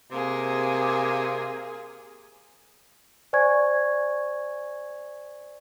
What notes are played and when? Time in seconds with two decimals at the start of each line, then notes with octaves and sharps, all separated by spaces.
0.11 C3 A#3 G#4
3.33 C5 D5 G#5 C#6 G#6